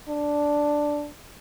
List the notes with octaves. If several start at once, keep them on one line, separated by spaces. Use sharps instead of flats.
D4